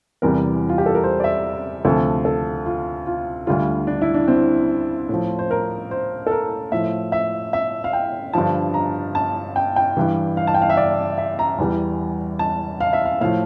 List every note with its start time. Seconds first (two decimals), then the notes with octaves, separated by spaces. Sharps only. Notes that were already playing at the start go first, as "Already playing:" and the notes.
0.22 E2 C3 E3 G3 A#4
0.69 F4
0.78 G4
0.86 A4
0.95 A#4
1.04 C5
1.20 D5
1.24 E5
1.85 D2 C3 F3 A4
2.25 A4
2.66 F4
3.07 F4
3.47 D2 D3 G3 F4
3.87 D4
4.02 E4
4.14 D4
4.28 C4
5.09 A2 F3
5.39 C5
5.51 A#4
5.91 C5
6.27 A4
6.31 A#4
6.72 A2 F3 E5
7.12 E5
7.53 E5
7.84 F5
7.93 G5
8.33 G2 D3 F3 A5
8.74 A#5
9.15 A5
9.56 G5
9.76 G5
9.97 G2 E3 G3
10.37 F5
10.47 A5
10.54 G5
10.62 F5
10.70 E5
10.77 D5
11.18 E5
11.39 A#5
11.58 E2 E3 G3
12.39 A5
12.80 F5
12.93 E5
13.05 F5
13.21 A2 F3 F5